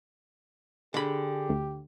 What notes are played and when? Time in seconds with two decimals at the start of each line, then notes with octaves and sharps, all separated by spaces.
0.94 D3 G4 G#4 B5
1.49 D2